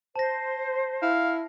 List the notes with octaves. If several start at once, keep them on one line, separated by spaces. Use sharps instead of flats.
C5 A5 A#6
E4 F5